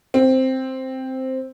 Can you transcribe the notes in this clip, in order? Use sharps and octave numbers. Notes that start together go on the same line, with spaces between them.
C4